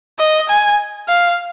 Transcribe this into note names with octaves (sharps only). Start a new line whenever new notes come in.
D#5
G#5
F5